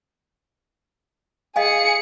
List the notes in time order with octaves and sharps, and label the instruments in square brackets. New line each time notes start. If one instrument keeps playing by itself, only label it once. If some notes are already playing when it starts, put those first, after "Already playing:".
[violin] G#4 C#7 [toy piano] D#5 F5 G#5